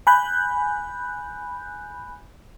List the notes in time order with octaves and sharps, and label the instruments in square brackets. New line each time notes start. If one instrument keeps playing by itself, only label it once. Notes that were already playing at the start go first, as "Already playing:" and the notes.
[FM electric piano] G#5 B5 F#6 G6